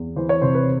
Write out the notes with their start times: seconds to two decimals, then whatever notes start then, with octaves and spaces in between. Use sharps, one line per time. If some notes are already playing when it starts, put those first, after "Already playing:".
Already playing: E2
0.16 E3 C5
0.29 C#5
0.42 C3 C5
0.55 B4